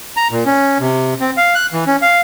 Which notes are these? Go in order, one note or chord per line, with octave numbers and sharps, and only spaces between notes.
A#5
A#2
C#4
C3
C4
F5
F#6
E3
C#4
F5